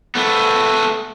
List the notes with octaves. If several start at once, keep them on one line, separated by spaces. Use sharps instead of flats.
A3 B3